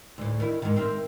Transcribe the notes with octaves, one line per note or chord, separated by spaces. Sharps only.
D2 A2
D#3 E4
G#2 D#3
C4 A#4 E5